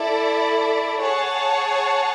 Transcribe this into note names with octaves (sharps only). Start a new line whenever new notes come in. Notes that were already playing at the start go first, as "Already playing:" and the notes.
Already playing: E4 A4 D5
G#4 C#5 F#5 A5